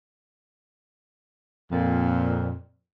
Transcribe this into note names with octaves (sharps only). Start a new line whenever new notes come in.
F2 A#2